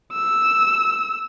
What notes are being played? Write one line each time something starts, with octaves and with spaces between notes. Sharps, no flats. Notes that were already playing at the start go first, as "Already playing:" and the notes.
E6